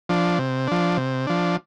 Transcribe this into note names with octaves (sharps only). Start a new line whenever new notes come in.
F3 D4
C3
F3 D4
C3
F3 D4